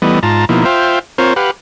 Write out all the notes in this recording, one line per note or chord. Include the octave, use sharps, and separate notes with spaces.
E3 G3 A3 B3 D#5
G#2 F4 A5 A#5
B2 F3 A#3 D#4 E4
F4 C5 E5 F5 G5
C4 F4 A#4 C5 C#5
G4 B4 F5 F#5